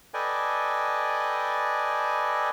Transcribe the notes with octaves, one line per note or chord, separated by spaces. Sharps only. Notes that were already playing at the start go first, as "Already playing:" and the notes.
A4 B4 D5 D#5 G5 G#5